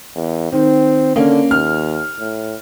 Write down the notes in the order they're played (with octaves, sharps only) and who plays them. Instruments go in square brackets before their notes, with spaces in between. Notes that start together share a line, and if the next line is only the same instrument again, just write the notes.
[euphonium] E2
[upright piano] D#3 [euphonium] C4
[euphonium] D3 [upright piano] A#3 C#4
[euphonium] D#2 [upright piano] F6
[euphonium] A2